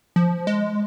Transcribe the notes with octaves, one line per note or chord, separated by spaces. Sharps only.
F3
G#3